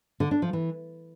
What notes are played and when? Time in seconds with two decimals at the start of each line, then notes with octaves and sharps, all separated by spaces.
0.20 D3
0.31 D4
0.42 F3
0.53 E3